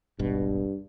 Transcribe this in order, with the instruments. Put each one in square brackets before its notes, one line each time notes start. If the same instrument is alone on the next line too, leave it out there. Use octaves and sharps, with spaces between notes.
[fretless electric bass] D#1 G#1 B2 [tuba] G2